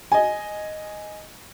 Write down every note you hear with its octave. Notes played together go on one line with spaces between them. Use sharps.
D#5 G#5